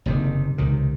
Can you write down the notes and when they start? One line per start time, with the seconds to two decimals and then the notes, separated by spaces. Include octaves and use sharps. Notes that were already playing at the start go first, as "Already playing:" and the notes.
0.06 F#1 C3 D#3
0.58 C#2 C3 D#3